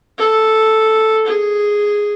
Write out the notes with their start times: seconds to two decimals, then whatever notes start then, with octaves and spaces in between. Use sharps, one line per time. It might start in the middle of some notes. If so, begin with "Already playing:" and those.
0.18 A4
1.27 G#4